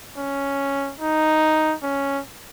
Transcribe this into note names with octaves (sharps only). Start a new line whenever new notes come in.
C#4
D#4
C#4